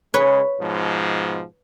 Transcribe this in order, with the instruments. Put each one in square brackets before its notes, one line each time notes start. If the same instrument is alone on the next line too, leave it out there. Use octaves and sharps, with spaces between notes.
[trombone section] C#3 G#3 [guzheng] B4 C#5
[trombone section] G#2 B2 F3